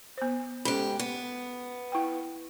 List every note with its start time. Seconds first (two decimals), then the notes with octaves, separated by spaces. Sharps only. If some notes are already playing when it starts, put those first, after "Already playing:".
0.17 B3 C5
0.65 G#2 C#4 G4 A4
0.99 B3
1.92 E4 G5